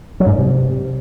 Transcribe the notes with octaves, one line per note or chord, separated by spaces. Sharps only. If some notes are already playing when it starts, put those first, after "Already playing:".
F#3
G#2
G2
C3